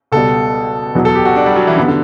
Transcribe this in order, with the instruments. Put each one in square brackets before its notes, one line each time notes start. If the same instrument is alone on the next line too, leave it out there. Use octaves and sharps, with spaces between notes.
[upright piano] C#2 B2 G3 [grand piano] A4
[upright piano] E2 B2 F#3
[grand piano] A4
G4
F#4
D4
G3
F#3
E3
[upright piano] G2 F#3 B3 [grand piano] D3
[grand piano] D3